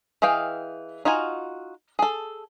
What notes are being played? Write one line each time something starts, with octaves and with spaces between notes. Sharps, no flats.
E3 G#4 D#5 F5 G5
D#4 F4 F#4 G#5
G#4 A4